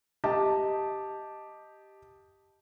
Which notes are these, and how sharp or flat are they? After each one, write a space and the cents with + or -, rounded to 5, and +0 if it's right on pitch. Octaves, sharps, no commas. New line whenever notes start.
G4 +0 D#5 +0 A5 +0